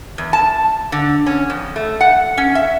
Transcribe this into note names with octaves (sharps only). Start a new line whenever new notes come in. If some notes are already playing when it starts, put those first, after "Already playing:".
E2
A5
D3
C#4
F2
A3
F#5
C#4
E5